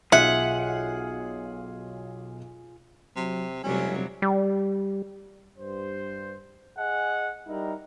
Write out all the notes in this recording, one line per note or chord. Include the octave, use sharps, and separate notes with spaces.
B1 F4 G#4 E5 F#5
C3 F#3
F1 C3 F#3 G3 C#4
G3
G2 C5
G#4 D#5 F#5 G#5
G3 D#4 E4 A#4